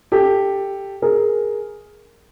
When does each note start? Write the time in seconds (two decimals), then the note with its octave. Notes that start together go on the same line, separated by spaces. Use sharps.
0.12 G4 A4
1.02 G#4 A#4